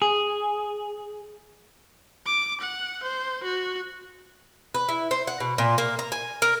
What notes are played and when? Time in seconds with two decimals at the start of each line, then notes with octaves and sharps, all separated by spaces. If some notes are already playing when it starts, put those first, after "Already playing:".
0.02 G#4
2.26 D6
2.61 F#5
3.03 C5
3.43 F#4
4.74 B4
4.89 E4
5.11 C5
5.27 F#5
5.40 B2
5.58 A#2
5.78 A#3
5.99 A#5
6.12 G#5
6.42 A#4